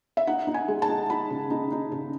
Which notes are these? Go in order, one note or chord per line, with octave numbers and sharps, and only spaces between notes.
E5
D#4 F#5
D#4
G#5
G#3
A5
D#4
D#4 B5
C#3
D#4
D#4
C#3